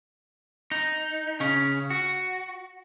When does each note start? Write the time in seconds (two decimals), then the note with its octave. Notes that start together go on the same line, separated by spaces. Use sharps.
0.72 D#4
1.40 C#3 C#4
1.90 F#4